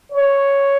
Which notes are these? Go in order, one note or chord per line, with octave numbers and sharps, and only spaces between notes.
C#5